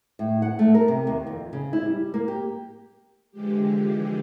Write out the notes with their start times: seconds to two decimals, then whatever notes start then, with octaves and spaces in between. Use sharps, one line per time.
0.19 A2
0.42 F#5
0.59 A3
0.75 A#4
0.88 C3
1.07 D#2
1.27 F2
1.53 C#3
1.73 E4
1.86 G3
2.14 A#3
2.28 G4
3.31 D3 E3 F3 G#3 G4